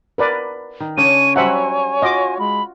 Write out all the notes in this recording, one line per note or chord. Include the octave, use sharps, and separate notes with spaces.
A#4 B4 D5
D#3
C#3 C#4 D4 C#5 D#7
F#3 G3 C5 E5 F#5 G#5
F4 F#4 D#5 D6
G#3 B5